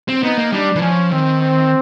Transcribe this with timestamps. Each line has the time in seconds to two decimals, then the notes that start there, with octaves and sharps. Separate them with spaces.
0.08 C4
0.23 B3 D#4
0.38 A#3
0.52 G3 D4
0.76 E3
0.81 F3 C#4
1.12 D#3 C4
1.41 C4